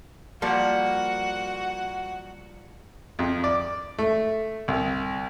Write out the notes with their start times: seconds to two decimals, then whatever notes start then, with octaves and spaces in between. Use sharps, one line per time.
0.42 F3 G3 A#3 F#4 F#5
3.19 F2
3.44 D5
3.98 A3
4.68 C2